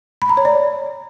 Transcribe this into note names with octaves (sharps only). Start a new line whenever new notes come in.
B5
A#5
C#5
D5